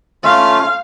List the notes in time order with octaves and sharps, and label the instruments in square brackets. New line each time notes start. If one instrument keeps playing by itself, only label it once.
[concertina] A3 C#4 F4 [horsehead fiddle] F5